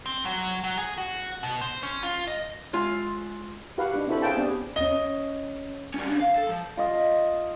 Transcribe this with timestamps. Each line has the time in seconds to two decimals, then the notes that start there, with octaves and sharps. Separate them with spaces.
0.06 C4
0.25 F#3
0.64 F#3
0.78 G#4
0.98 F#4
1.43 B2
1.61 C5
1.83 C#4
2.03 F4
2.27 D#5
2.73 G#3 F4 E5
3.78 F#4 G4 B4 F5 F#5
3.94 D4 D#4
4.07 C4 E4 F#4 A4 C5 B5
4.22 G#4 B4 C#5 F5 G5 A5
4.36 B3 C4 D4 G4 G#4
4.76 C#4 D#5 G7
5.94 G3 C#4
6.07 C#3 D4
6.20 F5
6.36 A4
6.49 F3
6.77 F4 D#5